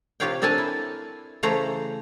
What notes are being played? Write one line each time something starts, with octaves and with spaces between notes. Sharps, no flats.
C3 F4 G4 C#5 F5 G5
C4 D4 A4 A#4 G#5 A5
E4
C#3 E3 A3 C5 C#5 A#5